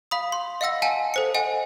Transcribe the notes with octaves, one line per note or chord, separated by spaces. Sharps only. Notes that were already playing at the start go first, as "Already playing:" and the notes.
F5 B5 D#6
C6
D#5 F5 F#5 E6 A#6
F5 F#5 G#5 A5
A4 C5 C#7
D#5 F#5 G#5